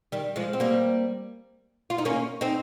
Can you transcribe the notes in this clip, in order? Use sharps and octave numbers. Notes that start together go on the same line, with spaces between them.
D#3 G3
F3 G#3
C4
G3 A#3
F4
D#4
A#3 C#4
C4 D#4